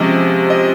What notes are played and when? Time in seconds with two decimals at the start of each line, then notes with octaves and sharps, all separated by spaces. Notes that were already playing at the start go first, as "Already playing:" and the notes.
Already playing: C3 F3 G#3 C#4 D#5
0.50 D#5